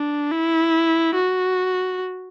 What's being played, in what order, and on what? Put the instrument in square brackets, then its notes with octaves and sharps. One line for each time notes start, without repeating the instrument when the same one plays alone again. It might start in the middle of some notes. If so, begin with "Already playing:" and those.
Already playing: [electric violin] D4
E4
F#4